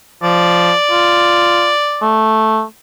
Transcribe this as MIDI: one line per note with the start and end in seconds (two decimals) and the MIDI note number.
0.23 0.72 53
0.23 2.17 74
0.92 1.71 65
2.02 2.62 57